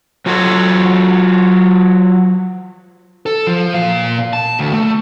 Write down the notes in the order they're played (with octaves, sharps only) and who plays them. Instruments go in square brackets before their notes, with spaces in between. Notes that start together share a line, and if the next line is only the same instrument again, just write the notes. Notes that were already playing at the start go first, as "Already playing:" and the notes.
[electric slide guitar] F#3 F4 F#4 A4 C#5
[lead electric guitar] A4
F3
A#2 F5
A5
D2
A3